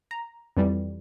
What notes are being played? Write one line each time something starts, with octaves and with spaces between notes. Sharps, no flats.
A#5
F2 E3 G3